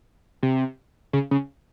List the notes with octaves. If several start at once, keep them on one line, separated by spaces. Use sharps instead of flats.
C3
C#3
C#3